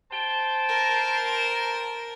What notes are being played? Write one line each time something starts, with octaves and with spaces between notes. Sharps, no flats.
C5 G5 A5
A#4